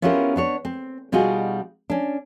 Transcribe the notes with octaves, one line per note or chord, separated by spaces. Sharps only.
B3 C#4 E4 F4 G4 A#4
B3 D4 C#5
C4
B2 G3 D#4 F4 F#4 G#4
C#4 D4